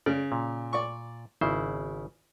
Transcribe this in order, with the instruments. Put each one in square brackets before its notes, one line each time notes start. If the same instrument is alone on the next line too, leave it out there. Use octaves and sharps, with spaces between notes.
[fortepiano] C#3 [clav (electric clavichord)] D5
[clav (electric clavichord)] A#2
[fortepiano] D5 C#6
[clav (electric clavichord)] G#1 C#3 C5 [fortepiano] E4